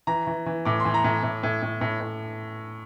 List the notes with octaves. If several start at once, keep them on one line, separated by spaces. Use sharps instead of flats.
E3 A#5
E3
E3
A2 D6
C6
E3
A#5
A2
A2
A2
A2
A2
A2